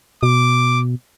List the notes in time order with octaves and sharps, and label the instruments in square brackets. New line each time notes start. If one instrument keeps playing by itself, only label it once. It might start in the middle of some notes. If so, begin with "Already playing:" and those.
[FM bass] B2 [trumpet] D6